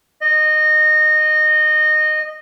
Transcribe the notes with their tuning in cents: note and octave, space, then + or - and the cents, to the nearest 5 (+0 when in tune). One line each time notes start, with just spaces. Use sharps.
D#5 -20